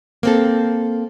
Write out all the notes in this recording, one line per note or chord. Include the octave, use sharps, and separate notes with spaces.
A#3 C4 A4